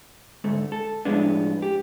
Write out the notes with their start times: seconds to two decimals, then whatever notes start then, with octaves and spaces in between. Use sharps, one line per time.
0.44 D2 G#2 A3
0.72 A4
1.05 A2 F3 G#3 B3 D4
1.62 G4